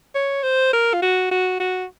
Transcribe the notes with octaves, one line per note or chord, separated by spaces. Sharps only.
C#5
C5
A#4
F4
F#4
F#4
F#4